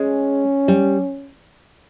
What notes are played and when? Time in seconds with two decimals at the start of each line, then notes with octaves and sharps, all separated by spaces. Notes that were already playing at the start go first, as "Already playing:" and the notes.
Already playing: G#3 C#4
0.68 G3